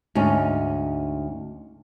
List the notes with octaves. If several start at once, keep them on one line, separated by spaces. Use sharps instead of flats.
D2 G#2 C#4 D#4